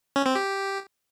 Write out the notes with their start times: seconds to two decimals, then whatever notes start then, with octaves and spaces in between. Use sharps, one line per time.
0.16 C#4
0.26 C4
0.36 G4